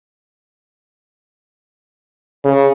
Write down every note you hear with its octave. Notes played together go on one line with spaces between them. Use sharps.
C#3